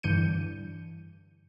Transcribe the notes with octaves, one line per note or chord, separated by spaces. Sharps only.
G2 D3 E3 G6 C#7 D#7